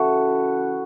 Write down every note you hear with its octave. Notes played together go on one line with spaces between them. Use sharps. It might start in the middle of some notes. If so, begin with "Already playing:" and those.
Already playing: C#3 E3 F#4 A4 B4